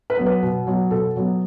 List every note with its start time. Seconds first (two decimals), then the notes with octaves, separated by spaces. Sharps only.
0.10 B4
0.18 F#3 B3
0.26 B4
0.42 B2
0.67 F#3 B3
0.91 B2 A4
1.16 F#3 B3